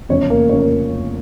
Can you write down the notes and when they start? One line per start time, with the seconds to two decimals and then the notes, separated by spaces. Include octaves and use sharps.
0.09 F1 E2 C#3 F3 C#4 C#5
0.30 A#3 A#4
0.49 F1 C#3 F3 C#4 C#5
0.60 A#3 A#4